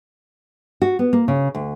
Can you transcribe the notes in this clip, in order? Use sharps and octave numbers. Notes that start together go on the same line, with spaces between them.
F#4
B3
A#3
C#3
D2